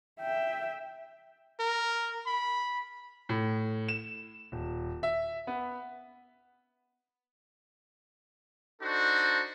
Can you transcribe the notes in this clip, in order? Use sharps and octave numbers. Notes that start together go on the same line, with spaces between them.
E5 G5
A#4
B5
A2
E7
D#1
E5
B3
D4 D#4 F#4 A4 C5